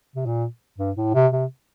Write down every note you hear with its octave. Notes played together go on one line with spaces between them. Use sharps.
C3
A#2
G2
A2
C3
C3